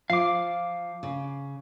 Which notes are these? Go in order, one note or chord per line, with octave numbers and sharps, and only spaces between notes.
F3 F5 D6
C#3